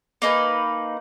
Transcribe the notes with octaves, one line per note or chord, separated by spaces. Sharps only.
A#3 D#4 B4 G#5